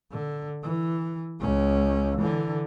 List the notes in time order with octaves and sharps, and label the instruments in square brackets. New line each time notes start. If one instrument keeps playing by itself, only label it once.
[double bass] D3
E3
C#2 C#4
D3 E3